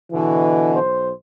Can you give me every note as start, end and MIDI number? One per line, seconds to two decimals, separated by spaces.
0.12 0.79 47
0.12 0.79 50
0.12 0.80 52
0.75 1.12 35
0.75 1.12 72